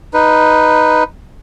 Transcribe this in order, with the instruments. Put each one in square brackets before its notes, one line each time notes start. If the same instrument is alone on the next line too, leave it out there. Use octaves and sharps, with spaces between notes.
[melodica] D#4 B4